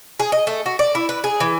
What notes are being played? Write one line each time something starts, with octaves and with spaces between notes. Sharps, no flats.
G#4
D#5
A3
F#4
D5
E4
B4
G#4
E3